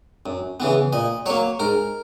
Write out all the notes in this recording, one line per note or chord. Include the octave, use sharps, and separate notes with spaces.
F#2
C#3 E3 B3
A#2 D#5
F#3 A#3 C#5
G#2 A#4